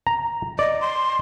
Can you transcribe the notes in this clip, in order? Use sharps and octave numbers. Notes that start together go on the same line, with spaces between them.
A#5
D5 D#5
C6